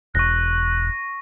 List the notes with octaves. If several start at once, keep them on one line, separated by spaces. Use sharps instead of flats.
E1 C#6 F#6 A#6